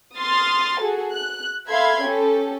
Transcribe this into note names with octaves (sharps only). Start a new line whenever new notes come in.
C6 D#6 F6 A6
F#4 G#4 A4
F#6
A4 E5 F5 B5 C6 G#6
C#4 G4 A4